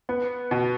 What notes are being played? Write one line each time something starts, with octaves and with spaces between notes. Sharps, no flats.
B3
B2